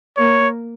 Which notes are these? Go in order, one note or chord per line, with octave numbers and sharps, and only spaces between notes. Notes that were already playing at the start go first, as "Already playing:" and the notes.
A#3 C#5